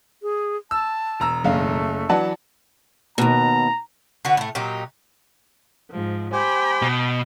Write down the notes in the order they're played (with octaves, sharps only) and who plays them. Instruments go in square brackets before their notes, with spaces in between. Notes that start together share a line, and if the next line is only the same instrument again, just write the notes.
[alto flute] G#4
[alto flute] A5 [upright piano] E6
[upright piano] E1 A#5 E6
[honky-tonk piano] F#1 F5 [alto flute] A3
[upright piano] E3 F#3 B4 [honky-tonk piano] D5 F#5 A5
[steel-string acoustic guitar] D#2 B2 [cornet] A#5
[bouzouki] D3 F#4 B4
A2 A3
A#2 F#3 D#4 G4
[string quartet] G#2 F3
[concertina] G4 C5 G#5 [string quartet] G5 B5
[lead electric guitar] B2